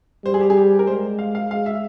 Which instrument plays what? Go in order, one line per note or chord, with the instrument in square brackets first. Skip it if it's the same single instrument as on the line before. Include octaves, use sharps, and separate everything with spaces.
[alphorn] G3 [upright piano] C5
[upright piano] G#4
G4
G#4
G4
A#4
[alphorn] G#3 [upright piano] C5
[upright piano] F5
F5
[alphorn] G#3 [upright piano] F5
[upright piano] E5